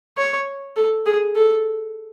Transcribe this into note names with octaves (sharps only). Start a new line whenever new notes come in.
C#5
A4
G#4
A4